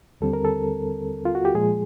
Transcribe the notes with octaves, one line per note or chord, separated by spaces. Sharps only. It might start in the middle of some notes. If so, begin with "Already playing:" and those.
D#2 D3 G3 C4 A4
A#4
A4
F4
F#4
G4
A#2 F3 G#3 G#4